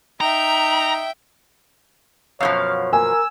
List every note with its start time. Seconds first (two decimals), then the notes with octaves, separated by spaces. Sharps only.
0.21 D#4 E5 G5 A#5
2.40 F#2 B2 F3 C#5 F5
2.93 A#4 G#5 E6